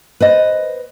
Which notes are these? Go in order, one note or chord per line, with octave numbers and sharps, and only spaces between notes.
B4 C5 D#5